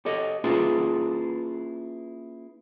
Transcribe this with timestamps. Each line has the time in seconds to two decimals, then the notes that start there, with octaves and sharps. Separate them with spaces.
0.05 G4 A4 C#5 D#5
0.44 A#3 C#4 E4 F4 G#4 B4